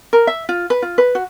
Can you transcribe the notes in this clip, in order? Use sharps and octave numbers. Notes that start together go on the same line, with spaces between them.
A#4
E5
F4
B4
F4
B4
F#4